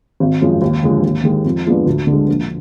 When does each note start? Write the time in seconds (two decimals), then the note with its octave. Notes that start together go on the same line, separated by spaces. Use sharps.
0.20 G#1
0.42 F#2 F3 G#3
0.62 D#2
0.83 D3 F3 G#3
1.03 D#2
1.24 D#3 G#3
1.45 F2
1.66 F3 G#3 B3 D4
1.86 D2
2.07 D3
2.12 G#3
2.29 A#1